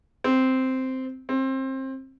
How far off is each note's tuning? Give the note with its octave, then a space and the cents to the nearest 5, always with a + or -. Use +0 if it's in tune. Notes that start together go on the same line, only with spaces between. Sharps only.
C4 -5
C4 +25